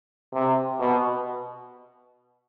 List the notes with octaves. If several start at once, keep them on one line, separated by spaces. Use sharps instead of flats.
C3
B2